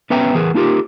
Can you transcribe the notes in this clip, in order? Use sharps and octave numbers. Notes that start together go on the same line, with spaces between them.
B3 C#4 B4 E5 G5 A#5
E3 G#4 A#4 B4
A#3 D#4 F4 G4 A#4